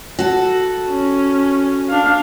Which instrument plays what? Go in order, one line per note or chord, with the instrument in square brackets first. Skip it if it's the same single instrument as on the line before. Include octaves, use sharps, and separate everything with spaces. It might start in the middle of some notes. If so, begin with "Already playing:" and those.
[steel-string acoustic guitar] F#4 A4
[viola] C#4
D4 F5